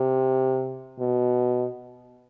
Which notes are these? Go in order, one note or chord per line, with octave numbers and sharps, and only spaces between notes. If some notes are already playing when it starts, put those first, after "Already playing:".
Already playing: C3
B2